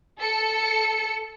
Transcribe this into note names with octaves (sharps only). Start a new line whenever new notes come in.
A4 C#7